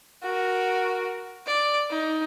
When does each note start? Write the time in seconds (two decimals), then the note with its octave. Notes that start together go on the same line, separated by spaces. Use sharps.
0.22 F#4 A#4
1.47 D5
1.90 D#4